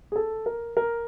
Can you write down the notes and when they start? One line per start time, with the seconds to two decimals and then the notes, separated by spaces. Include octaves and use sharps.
0.12 G#4
0.16 A4
0.46 A#4
0.77 A#4